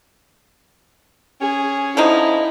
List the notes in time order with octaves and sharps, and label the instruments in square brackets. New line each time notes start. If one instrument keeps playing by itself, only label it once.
[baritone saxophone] C#4 [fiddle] G#4
[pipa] D3 F3 D#4 [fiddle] E4